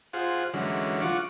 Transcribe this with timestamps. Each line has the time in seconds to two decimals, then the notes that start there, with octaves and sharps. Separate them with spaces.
0.13 F4 G#4 C5 F#5
0.54 D3 E3 F#3 G#3 C#4
1.02 F4 F#5 C#6 D6